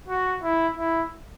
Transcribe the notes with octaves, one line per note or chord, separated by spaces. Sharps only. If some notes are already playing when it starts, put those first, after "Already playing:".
F#4
E4
E4